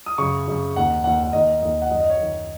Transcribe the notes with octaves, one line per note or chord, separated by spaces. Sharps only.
D#6
F#2 C#3 C#6
F#2 C#3
D#2 D#3 F#5
D#2 D#3 F#5
F#5
D#2 D#3 D#5
D#2 D#3 D#5
F#5
F#2 D#3 D#5
D#5
C#5
F#2 D#3